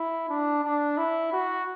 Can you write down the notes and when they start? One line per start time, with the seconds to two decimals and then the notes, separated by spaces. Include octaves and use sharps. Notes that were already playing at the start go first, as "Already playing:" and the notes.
Already playing: E4
0.29 D4
0.64 D4
0.97 E4
1.33 F#4